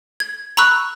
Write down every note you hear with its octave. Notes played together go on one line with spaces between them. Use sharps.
G#6
A#5 B5 C#6 E6 F#6